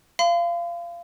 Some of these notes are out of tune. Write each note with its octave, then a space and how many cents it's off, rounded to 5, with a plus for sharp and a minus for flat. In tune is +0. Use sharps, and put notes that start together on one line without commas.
F5 -25 C6 -45